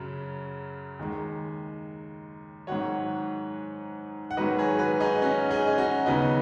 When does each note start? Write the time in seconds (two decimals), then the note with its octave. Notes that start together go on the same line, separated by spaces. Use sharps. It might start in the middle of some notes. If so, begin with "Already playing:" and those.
Already playing: F#2 C#3 F#3
0.99 D#2 D#3 G#3
2.67 G#2 D#3 F#3 C#5 F#5
4.31 F#5
4.37 G#2 D#3 F#3 B4 D#5
4.58 G#4 C#5
4.79 F#4 B4
5.00 D#4 G#4
5.22 C#4 F#4
5.51 D#4 G#4
5.67 D#4
5.78 C#4 F#4
6.06 D#2 C#3 F#3 B3 D#4